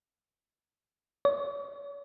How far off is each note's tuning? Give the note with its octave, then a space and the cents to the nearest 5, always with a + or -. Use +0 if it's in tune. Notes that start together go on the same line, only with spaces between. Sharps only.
C#5 +40